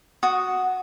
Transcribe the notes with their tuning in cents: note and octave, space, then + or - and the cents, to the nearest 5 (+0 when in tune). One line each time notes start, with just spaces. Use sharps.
F#4 +0 D#6 +0